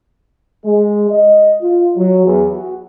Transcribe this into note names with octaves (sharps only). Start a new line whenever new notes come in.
G#3
D#5
F4
F#3
E2
F#4